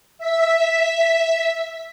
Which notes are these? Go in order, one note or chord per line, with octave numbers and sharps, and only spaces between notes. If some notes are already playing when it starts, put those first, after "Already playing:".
E5 B6